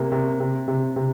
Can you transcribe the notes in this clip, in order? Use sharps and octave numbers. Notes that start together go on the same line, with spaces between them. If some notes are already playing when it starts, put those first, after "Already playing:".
Already playing: C3 A#3
C3
C3
C3
C3